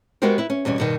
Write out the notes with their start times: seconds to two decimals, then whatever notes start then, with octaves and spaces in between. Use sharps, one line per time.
0.22 G#3 B3 F#4 G4 A#4 C5
0.38 E4 B4
0.50 C#4
0.65 E2 B2 G3 C#4
0.78 G2 B2 D#3